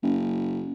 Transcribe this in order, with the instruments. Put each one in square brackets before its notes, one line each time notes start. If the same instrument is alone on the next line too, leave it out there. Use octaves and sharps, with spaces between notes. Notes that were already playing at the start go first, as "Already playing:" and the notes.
[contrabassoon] F#1